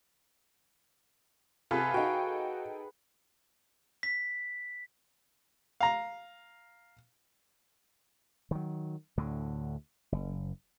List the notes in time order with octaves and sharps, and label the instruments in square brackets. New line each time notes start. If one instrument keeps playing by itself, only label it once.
[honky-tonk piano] C3 F4 A4 [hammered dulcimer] G#4 B4 F#5
[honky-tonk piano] D#4 A4 G5 [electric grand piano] F#4 F5
[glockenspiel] B6
[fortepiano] F5 A#5
[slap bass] D#3 F#3
D2 A2 D3
F#1